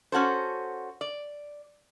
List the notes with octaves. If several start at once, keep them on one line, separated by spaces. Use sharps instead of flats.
C#4 F#4 A4 C5
D5